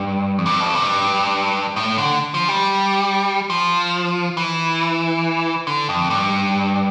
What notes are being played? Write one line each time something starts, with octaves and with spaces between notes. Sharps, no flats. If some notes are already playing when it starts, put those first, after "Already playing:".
Already playing: G2
F2
G2
F2
G2
A2
D3
F3
G3
F3
E3
D3
F2
G2